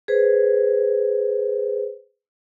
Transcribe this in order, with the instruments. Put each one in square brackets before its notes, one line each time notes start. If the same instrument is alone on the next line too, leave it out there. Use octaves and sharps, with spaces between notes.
[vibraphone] G#4 B4 C5